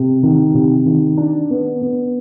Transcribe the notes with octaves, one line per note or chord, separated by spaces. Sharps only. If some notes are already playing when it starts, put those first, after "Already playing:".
Already playing: C3
D#3
C3
D#3
D4
B3
B3